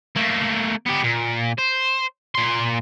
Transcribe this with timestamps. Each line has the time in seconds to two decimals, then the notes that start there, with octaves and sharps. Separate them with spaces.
0.16 A3 A#3
0.86 B3 G4
1.04 A#2
1.58 C5
2.35 A#2 C6